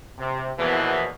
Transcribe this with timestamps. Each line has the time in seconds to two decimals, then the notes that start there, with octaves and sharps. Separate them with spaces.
0.18 C3
0.59 A#1 E2 B2 E3